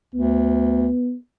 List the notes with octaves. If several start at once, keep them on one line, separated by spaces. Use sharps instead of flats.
D2 B3